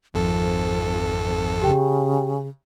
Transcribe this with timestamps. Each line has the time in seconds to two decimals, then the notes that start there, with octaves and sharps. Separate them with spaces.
0.14 G#1 F2 F3 A4
1.62 C#3 G4 G5